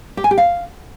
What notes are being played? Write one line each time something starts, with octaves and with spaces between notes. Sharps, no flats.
G4
G#5
G4
F5